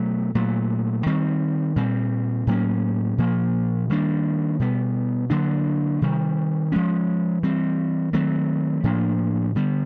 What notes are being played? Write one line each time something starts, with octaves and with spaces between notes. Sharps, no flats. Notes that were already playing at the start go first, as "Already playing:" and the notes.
Already playing: B2 F#3 A3
A#2 F#3 A3
D#3 G3 C4
A#2 G3 C4
A2 F#3 A#3 C#4
A#2 F3 A#3
D#3 G3 A#3 D4
B2 G3 B3
D3 F#3 A#3 D4
C3 D#3 G3
F3 G#3 C#4
E3 G3 C4
D#3 F#3 A3 C4
A2 F3 A#3 D4
D3 G3 B3